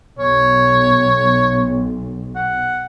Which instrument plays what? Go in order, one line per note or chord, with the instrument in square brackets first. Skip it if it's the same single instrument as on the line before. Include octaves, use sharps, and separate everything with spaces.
[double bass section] B1 [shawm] C#5
[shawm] F#5